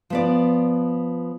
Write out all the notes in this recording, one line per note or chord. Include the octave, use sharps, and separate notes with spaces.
F3 B3 D5